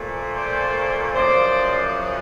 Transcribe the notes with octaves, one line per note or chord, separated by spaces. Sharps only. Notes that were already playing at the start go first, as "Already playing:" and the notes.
Already playing: A#2 F3 A3
C5 D5
F#2 C#3 F3 C5 D5